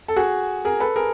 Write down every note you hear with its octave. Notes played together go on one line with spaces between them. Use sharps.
A4
F#4 G#4
G#4 A#4
A4 B4
G#4 A#4